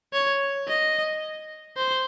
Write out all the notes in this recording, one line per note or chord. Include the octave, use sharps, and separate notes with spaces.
C#5
D#5
C5